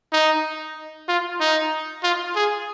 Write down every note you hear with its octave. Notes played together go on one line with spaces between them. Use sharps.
D#4
F4
D#4
F4
G#4